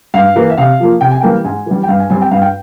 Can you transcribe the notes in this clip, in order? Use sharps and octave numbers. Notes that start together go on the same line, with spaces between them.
G2 F5
E3 A#3
E5
C3 F5
F3 A#3
C3 G5
G#5
E3 G3 A#3 G5
G#2 G#5
E3 G3
G5
G2 F5
G#5
G3 C4 G#5
G5
G2 F5
G5